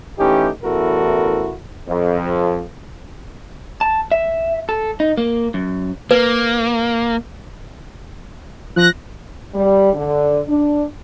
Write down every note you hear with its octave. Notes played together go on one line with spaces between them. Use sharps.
E3 A3 C#4 D#4 G4
A1 E2 E4 F#4 A4 A#4
F2
A5
E5
A4
D#4
A#3
F#2
A#3 B4
F3 F#6 A#6
G3
D3
D4